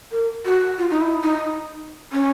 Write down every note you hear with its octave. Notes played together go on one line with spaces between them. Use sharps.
A#4
F#4
F4
D#4
E4
D#4
C#4